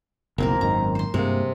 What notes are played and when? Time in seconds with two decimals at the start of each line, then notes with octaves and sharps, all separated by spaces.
0.38 F#1 B1 A#3 C4 A#4
0.61 G#1 F#2 D#3 A#5
0.95 C5 C6
1.14 G2 C3 G#3 A#3